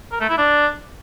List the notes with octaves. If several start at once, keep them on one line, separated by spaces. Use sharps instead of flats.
A#4
A3
E4
D4